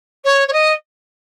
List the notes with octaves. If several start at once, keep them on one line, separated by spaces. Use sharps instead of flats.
C#5
C#5
D#5